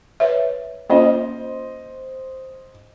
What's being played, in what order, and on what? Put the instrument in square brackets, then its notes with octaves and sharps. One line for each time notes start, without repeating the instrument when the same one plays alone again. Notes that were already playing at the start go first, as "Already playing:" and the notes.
[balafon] B4 C#5 E5
[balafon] A#3 C#4 F4 [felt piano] C5 D#5